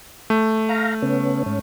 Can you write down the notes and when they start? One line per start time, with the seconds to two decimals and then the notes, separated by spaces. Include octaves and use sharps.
0.30 A3
0.69 F5 A#5
1.02 C#3 B3 C#4
1.46 G#2 C#4